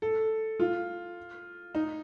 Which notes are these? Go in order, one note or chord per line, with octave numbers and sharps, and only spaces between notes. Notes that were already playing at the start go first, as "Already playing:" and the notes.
A4
F4
D#4